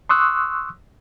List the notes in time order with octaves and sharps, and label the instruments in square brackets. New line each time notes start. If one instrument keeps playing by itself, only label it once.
[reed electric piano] C6 C#6 D#6 E6 F#6